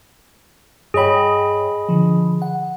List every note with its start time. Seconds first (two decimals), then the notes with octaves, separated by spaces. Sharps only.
0.94 G2 G#4 C#5 D#5 G5 B5
1.89 D3 F3
2.42 F#5